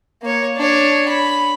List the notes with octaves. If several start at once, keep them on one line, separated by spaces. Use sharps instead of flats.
A#3 C#5
D4 C#5
B5